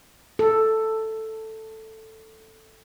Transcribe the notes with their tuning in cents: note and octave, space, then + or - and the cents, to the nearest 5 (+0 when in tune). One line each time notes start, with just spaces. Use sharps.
A4 +5